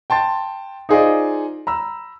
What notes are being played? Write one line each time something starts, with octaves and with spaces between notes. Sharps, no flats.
G5 A5 C6 A6
D#4 F4 G#4 C5 D5 D#5
A#5 B5 E6